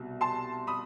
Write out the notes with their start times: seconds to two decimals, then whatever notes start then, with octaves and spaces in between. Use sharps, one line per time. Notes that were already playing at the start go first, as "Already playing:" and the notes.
Already playing: C2 B2
0.21 A5 C6
0.67 B5 D#6